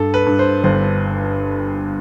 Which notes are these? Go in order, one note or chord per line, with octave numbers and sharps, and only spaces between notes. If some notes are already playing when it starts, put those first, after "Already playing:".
Already playing: G2 A4
B4
G2
C5
G1 C5